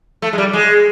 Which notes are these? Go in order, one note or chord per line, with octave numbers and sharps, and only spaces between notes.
A3
G#3
G3
G#3